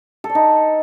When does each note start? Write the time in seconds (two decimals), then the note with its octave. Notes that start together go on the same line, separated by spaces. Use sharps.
0.24 A4
0.29 D5
0.35 D#4